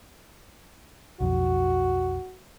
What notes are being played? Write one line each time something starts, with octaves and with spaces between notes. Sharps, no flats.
B1 F2 F#4